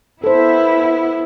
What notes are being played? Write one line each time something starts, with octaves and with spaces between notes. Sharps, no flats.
B3 E4 A4 C5